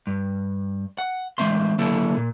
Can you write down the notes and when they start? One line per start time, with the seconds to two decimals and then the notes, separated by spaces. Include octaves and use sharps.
0.07 G2
0.98 F#5
1.38 E3 G#3 C4 E5 C6
1.79 D3 F#3 A#3 E4 A4
2.17 A#2